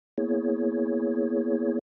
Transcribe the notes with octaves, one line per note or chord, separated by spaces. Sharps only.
A#3 B3 E4 G#4 C#5